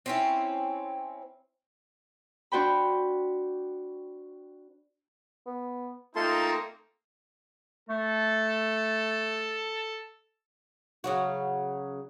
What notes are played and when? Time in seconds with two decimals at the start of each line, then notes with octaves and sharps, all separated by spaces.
0.06 C4 C#4 E4
2.52 D4 F#4 C5 G5 B5
5.46 B3
6.16 A3 A#3 C4 D#4 F4 A5 C6
7.89 A3 A4
11.04 C#3 F#3 F#4